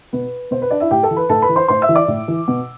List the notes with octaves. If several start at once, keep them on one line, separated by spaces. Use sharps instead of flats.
B2 B4
B2 C5
B4
D4 D5
E4 E5
A2 G4 G5
A4 A5
E3
B4 B5
A2 A4 A5
B4 B5
E3
C5 C6
A2 C5 C6
E5 E6
E3
D5 D6
A2
E3
B2